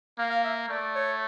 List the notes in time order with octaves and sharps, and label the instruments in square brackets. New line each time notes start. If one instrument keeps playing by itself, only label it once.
[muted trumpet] A#3 [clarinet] F5
[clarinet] F5
E5
[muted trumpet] A3 [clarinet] D5
[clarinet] C#5